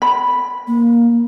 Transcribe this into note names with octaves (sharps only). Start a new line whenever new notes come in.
B5
A#3